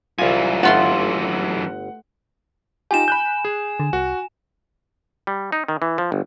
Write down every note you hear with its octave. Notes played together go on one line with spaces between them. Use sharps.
C2 F#2 E3 F4 G#5
G1 A3 F4 F#5 C6
D#4 F4 G4 G#5 E7
B5 F#6 G6
G#4
D3
C2 F#4
G3
D#4
D#3
E3
F3
G1